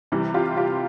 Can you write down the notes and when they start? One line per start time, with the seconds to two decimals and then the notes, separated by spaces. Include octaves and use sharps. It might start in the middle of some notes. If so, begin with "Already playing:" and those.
0.12 C3 E3 G3
0.34 F4 G4
0.57 F4 G4